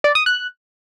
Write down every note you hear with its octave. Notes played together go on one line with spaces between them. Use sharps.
D5
D#6
F#6